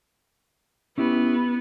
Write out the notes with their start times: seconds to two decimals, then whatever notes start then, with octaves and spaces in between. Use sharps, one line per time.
0.98 B3 C#4 E4 G4